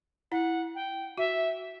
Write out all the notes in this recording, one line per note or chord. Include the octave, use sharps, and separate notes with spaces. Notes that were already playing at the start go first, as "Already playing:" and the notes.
E4 F#5
G5
F#4 E5